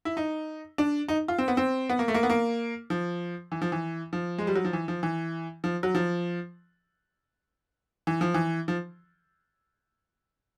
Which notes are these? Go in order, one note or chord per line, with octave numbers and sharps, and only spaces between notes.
E4
D#4
D4
D#4
F4
C4
B3
C4
B3
A#3
A3
A#3
B3
A#3
F3
E3
F3
E3
F3
G#3
G3
F#3
F3
E3
F3
E3
F3
F#3
F3
E3
F3
E3
F3